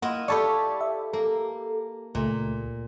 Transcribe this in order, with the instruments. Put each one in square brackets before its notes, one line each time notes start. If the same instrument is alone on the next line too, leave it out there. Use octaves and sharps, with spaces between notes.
[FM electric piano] A#3 F#5 [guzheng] E4 F4 D#5
[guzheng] G4 A4 C#5 [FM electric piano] D5 A5 B5
[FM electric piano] E5
[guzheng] A#3 [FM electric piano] A4
[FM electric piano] C#2 A3 [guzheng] A#2